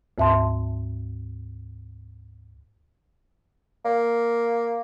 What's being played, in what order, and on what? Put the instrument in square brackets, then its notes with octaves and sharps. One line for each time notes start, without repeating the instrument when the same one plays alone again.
[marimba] D2 G#2 E5 A5 C6
[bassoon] A#3